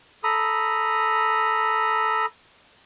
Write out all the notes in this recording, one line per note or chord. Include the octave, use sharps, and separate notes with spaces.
A4 A#5 B5 D#6